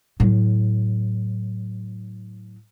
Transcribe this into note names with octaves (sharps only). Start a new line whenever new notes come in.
A2 F#3